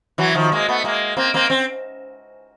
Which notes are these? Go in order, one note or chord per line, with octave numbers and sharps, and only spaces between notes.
E3 F#3
D#3 F3
G#3 A#3
A3 B3
G#3 A#3
A#3 C4
A#3 C4
C4